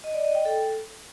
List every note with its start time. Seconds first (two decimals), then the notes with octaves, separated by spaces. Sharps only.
0.04 D#5
0.14 D5
0.25 D#5
0.35 G5
0.45 A4